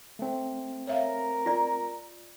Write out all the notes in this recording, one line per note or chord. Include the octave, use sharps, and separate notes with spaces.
A3 C4
A#4 C#5 E5 F5
F4 D5